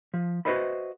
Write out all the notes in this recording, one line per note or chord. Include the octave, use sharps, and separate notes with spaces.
F3
F#4 B4 C5 D#5 E5 B5